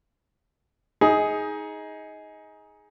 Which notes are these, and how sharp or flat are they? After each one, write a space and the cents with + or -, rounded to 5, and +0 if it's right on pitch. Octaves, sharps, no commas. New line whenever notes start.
D#4 +20 G#4 +5